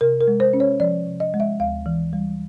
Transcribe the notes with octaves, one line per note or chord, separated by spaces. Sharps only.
C3 A#4
A#4
G#3
C5
C#4
C#5
F3 D5
C3
D#5
G#3
E5
D2 F5
E3
G3